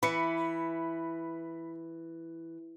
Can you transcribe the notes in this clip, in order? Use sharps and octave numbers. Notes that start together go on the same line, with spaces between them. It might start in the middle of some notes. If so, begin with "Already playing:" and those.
E3 B5 C#7